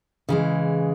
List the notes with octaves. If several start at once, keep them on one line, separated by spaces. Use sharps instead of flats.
C#3 E3 G#3